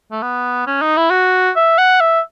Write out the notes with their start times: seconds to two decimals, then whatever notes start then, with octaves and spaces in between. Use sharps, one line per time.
0.12 A3
0.22 B3
0.67 C#4
0.81 D#4
0.97 E4
1.10 F#4
1.56 E5
1.78 F#5
2.00 E5